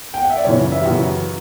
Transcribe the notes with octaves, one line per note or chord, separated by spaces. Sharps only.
G5
F#5
E5
D5
F#2 C#3 E3 C#5
E5
G4
F#2 C#3 E3 F#4